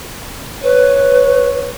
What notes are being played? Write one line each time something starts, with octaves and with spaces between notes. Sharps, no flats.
B4 C#5